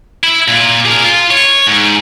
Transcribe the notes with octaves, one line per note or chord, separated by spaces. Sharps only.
E4
A#2
G#4 A#4
F4
C#5
G#2